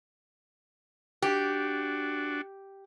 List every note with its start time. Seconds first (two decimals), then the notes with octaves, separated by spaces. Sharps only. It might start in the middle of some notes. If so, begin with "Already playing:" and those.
1.22 D4 F#4 G4